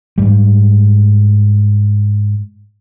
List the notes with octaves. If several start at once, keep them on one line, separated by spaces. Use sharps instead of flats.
G#2 G3